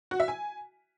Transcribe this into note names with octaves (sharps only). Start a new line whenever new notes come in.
F#4
E5
G#5